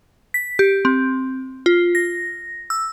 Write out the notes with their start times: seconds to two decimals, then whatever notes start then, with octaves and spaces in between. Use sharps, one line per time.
0.34 B6
0.59 G4
0.85 C4
1.66 F4
1.95 A#6
2.70 E6